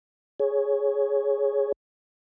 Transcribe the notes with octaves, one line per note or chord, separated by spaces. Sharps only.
G#4 C#5